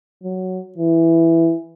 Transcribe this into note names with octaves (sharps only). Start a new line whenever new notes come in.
F#3
E3